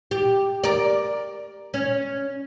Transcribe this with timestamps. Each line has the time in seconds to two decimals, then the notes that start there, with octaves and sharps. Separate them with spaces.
0.11 G4
0.64 A#4 D5
1.74 C#4